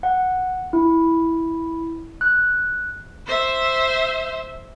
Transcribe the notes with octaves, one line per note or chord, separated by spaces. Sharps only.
F#5
E4
F#6
C5 E5